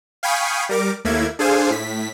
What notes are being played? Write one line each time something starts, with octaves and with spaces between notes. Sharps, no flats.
F5 G5 G#5 B5 C#6 D#6
G3 A#4 D6
D#2 A3 A#3 E4 G#6
D4 G#4 A4 C5 F5 G#5
A2 B6